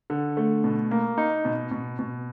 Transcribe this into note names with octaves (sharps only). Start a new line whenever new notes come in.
D3
A3
B2
A#3
D#4
B2
B2
B2